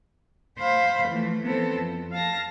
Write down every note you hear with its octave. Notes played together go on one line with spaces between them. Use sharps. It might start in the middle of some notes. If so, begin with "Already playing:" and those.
C5 F5 B5
E3 F3 A3
E3 B3 C4 A4 C5
F2
F5 A5 A#6